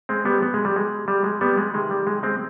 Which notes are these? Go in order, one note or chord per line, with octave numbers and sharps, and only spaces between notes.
G#3 C4
G3 B3
B2 B3
G#3
G3
G#3
G3
G#3
G3 B3
G#3
C3 D#3 G#3
G3
G#3
G#3 C4